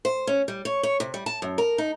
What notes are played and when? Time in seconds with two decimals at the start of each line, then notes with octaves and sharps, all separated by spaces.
0.05 C5
0.27 C#4
0.48 G3
0.65 C#5
0.83 C#5
1.00 C3
1.14 G3
1.26 A5
1.42 F#2
1.58 A#4
1.78 D#4